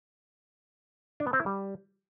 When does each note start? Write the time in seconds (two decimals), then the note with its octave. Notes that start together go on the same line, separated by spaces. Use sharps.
1.20 D4
1.27 B3
1.33 C4
1.40 E4
1.46 G3